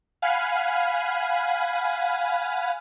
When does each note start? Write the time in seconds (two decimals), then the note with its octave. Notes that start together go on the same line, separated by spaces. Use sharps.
0.22 F5 F#5 G#5 B5